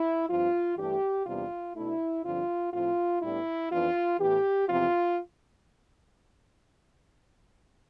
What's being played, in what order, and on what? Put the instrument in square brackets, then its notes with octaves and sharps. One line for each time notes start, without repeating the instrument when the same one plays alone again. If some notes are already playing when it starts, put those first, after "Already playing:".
Already playing: [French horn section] E4
G2 F3 C4 F4
G2 E3 A3 D4 G4
E2 C3 G3 B3 D4 F4
B2 A3 D4 E4
G2 D3 F3 C4 F4
A2 F3 C4 F4
A2 G3 B3 D4 E4
F2 E3 B3 D4 F4
A2 E3 B3 G4
E2 C3 F3 C4 F4